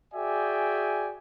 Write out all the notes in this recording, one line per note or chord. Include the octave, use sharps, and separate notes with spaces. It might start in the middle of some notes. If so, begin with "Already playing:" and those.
F#4 G#4 D5 E5 G5 G#5